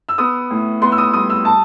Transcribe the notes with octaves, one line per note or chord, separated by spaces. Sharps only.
E6
B3 D#6
A2
B3 C6
E6
D#6
G3 D#6
E6
A5